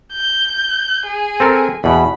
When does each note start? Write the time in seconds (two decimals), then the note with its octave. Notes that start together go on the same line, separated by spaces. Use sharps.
0.13 G6
1.06 G#4
1.40 C4 A4 A#4
1.84 E2 B2 B5